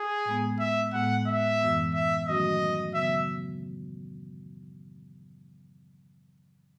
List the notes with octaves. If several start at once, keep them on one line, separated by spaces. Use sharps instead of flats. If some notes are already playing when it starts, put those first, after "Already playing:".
Already playing: G#4
A2 G#3 B3
E5
A2 G#3 B3 F#5
E5
F#2 E3 B3
E5
D#3 F#3 A3 C#4 F#4 D#5
C#3 F#3 B3 E5